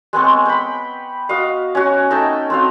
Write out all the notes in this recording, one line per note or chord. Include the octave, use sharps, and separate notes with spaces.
G#3 B3 C4 C#6
G5 B5
F#4 D#5 F5
C#4 F#4
A3 D#4 G5 A5
C4 F#4 F5